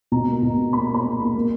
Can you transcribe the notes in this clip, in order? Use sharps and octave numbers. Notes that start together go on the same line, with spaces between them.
B2 A#5
A#3
B2
A#3
A#3 B5
A#3
B5
A#3
A#3
A#3